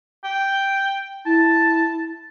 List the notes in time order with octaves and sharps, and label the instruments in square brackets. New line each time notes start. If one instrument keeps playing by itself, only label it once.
[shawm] G5
[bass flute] E4 [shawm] A5